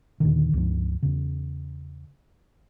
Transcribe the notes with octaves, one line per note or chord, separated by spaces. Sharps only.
D#2 A#2 D3 D#3
C#2 G2 F3
E2 C#3